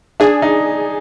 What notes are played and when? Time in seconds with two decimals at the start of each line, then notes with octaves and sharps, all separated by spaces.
0.20 D4 G#4
0.42 D#4